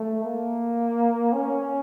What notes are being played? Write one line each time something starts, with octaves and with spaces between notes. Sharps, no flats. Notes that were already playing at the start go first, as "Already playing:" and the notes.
Already playing: A3
A#3
C#4